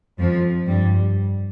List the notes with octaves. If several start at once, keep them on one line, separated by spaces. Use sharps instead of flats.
F2 F3
G2 G3